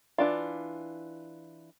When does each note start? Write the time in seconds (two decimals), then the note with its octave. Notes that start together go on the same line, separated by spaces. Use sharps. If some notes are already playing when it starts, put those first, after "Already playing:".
0.18 E3 D4 F4